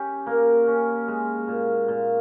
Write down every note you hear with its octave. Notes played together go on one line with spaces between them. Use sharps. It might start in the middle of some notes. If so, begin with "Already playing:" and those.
Already playing: C#4 G4
A#3 A#4
C#4
G#3
A#2
A#2